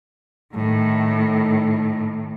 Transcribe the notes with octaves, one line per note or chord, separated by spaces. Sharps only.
A2 D#3